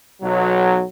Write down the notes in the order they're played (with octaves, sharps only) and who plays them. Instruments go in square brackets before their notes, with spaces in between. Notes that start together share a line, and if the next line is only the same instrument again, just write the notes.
[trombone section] B1 F#3